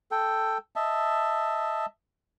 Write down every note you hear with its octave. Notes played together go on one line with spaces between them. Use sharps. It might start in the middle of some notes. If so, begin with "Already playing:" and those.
A4 G5
D#5 E5 A5